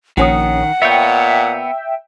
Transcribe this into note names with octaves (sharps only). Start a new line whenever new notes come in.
A#1 D#3 C#4 F#5 D#6
A#2 B3 C#5 E5 G5